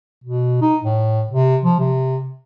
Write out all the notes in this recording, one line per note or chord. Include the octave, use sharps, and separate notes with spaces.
B2
D#4
A2
C3
F3
C3